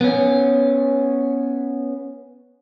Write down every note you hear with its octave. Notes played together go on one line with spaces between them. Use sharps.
B3 C#4